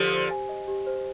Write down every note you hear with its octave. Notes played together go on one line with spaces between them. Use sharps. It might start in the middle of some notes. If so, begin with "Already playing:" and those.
Already playing: D3 F3 G4
C5
G#5
D#5
G4
C5